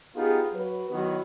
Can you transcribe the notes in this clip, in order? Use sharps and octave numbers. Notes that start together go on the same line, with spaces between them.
B3 D#4 F4 G4 G#4
F#3 B4
D#3 F#3 B3 E4 F#4